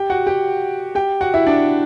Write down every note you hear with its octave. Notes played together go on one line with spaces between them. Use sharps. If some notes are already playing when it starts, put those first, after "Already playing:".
Already playing: G4 G5
F#4 F#5
G4 G5
G4 G5
F#4 F#5
E4 E5
D4 D5